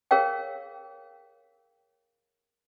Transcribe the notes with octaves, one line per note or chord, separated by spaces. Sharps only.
G#4 A#4 C#5 F5 G5